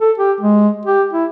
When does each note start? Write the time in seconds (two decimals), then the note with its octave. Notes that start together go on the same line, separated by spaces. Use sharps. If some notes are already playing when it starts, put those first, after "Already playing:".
0.01 A4
0.18 G4
0.41 G#3
0.86 G4
1.14 E4